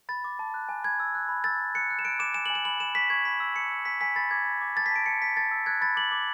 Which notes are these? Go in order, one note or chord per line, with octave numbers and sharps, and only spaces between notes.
B5 A6
D6
A5
F#6
G#5
B5 G#6
E6
F#6
B5
E6 A6
E6
F#6 C#7
F#6
E7
F#6 D7
D6 E7
G#5 E7
F#7
G#5
E7
B5 F#7
B5 E7
C#6 B6
C#6 G#6
B5 B6
E6
A5 C#7
E6
G#5 B6
G#5 B6
B5 A6
D6 G#6
B5
D6
A5 A6
B6
A5 D7
A5 C#7
A5 B6
A5 A6
E6
F#6 G#6
B5 A6
D6 F#7
D6